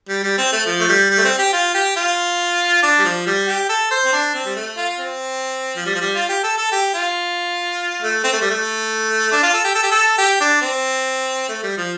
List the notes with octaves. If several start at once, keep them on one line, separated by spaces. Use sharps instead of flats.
G3
G3
C4
A3
F3
A3
G3
G3
A3
C4
G4
F4
G4
F4
D4
G3
F3
G3
G4
A4
C5
C4
D4
C4
G3
A3
F4
C4
F3
G3
F3
G3
F4
G4
A4
A4
G4
F4
A3
C4
A3
G3
A3
D4
F4
A4
G4
A4
G4
A4
G4
D4
C4
A3
G3
F3